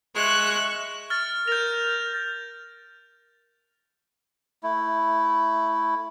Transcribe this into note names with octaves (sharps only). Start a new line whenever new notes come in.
G#3 E5 C#6 F#6
F6 A6
A#4 G6 F7
A3 E4